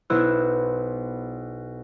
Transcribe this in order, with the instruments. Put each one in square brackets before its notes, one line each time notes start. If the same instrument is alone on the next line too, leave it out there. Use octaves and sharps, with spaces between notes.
[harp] B1 B3 E4 C5 E6 F#6